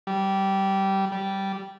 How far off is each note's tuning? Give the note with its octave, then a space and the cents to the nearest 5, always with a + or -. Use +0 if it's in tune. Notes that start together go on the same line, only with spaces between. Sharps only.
G3 -15
G3 -10